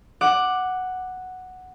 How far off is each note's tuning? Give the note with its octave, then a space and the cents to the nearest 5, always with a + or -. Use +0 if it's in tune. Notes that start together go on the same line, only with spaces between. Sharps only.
F#5 +0 D6 +10